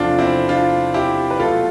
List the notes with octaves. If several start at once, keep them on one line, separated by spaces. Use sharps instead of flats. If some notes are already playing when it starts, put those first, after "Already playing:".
Already playing: E2 C3 F3 A3 D4 F4
C4 E4
D4 F4
E4 G4
B4
B1 B2 A3 F4 A4